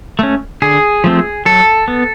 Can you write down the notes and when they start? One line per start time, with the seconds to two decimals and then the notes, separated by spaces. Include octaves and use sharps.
0.19 A3 C#4
0.62 D3 G#4
1.04 F3 A3 C4
1.45 F#3 A4
1.88 B3